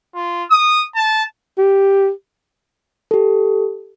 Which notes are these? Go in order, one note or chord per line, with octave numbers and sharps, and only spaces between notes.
F4
D#6
A5
G4
G4 A4